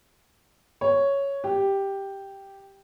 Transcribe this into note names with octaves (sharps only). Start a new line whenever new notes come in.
C#5
G4